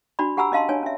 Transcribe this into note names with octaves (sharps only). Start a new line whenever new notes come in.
D4 F#4 D5 B5
G4 F#5 G#5 A#5 B5 E6
C#4 D#5 F5 A5 C6
D4 C#5 G#5
C#4 E5